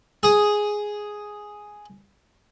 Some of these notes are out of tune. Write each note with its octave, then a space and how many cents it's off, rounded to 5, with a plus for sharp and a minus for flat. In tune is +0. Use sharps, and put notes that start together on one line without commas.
G#4 +0 D#6 +0